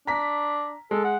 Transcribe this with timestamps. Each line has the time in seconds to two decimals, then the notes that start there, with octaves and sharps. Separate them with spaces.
0.07 D4 A#5 B6
0.91 G#3 A4
1.04 F#5